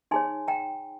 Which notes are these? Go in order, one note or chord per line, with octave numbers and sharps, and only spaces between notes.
D#4 G#4 C#5 G#5 C6
G5 A#5